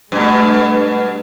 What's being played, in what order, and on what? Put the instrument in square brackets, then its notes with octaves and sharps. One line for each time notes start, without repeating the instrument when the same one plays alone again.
[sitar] G2 B2 [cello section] G#3 A3